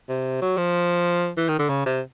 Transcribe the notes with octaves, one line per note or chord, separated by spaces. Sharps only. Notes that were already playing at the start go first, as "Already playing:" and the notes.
C3
F#3
F3
E3
D#3
D3
C#3
C3